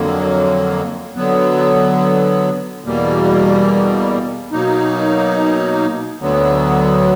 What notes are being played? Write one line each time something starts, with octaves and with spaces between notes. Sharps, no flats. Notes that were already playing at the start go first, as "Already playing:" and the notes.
Already playing: F2 D3 F#3 A#3
D3 F#3 B3
E2 B2 G3 A#3
B2 F#3 A#3 D#4
D2 D3 F#3 B3